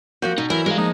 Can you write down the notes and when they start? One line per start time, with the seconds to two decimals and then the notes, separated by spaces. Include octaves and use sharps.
0.22 F3 A#3 C4 F#4 G6
0.38 B2 D#4
0.50 E3 F#3 E4 A#4
0.66 G#3 A#4 F5
0.78 F3 A#3 D#4